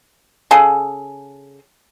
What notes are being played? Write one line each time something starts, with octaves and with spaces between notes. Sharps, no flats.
C#3 G#4 A4